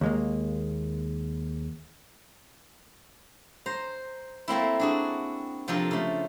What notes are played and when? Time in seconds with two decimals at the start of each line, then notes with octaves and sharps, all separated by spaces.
0.01 D#2 G#3 A#3
3.66 C5 A#5
4.48 A3 A#3 C4 E4
4.80 D4 F#4 G#4
5.68 C3 F3 D4 F4 A4 A#4
5.91 C#3 A3